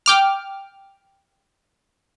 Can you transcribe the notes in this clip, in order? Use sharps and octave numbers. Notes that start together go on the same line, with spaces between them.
G5 D6 F6